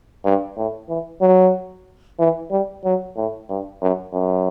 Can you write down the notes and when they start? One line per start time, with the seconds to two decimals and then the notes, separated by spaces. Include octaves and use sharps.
0.25 G2
0.57 A2
0.89 E3
1.22 F#3
2.19 E3
2.51 G3
2.84 F#3
3.17 A2
3.49 G2
3.82 F#2
4.13 F#2